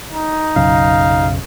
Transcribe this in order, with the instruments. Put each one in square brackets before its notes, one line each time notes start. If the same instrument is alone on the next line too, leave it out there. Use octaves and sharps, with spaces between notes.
[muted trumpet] D#4
[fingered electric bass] B1 F#2 C#3 [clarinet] F5